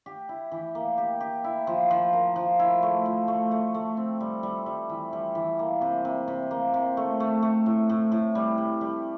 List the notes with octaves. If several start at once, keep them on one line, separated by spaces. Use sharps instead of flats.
G4
E4
E3
A#3
G4
G4
E4
F3
F3
A#4
F3
E4
A3
F3
A3
A3
A3
C4
G3
G3
G3
E3
G3
E3
A#3
C3
C3
C3
A#3
C3
A3
A3
A3
A2
A2
A2
G3
G3
G3